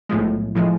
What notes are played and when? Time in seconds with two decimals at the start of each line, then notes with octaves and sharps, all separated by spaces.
0.09 B1 A2 F3 G#3
0.55 A2 F3 G#3